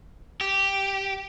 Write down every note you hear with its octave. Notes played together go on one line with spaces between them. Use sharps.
G4